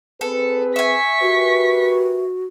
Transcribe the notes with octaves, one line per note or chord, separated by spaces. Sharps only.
C4 G#4 A4 B4
E5 G#5 C#6 B6
F#4 G4 A#4 B4